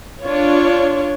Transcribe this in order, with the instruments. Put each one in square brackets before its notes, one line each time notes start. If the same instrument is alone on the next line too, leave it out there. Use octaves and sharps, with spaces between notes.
[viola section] D4 F4 C#5